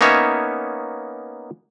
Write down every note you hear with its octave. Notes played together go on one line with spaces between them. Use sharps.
A#3 B3 C#4 D#4 C#5 E5